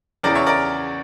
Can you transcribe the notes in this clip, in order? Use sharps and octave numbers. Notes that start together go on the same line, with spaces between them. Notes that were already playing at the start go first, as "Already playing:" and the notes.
E2 C#3 E3 A#4 D5
C#5 E5
A#4 D5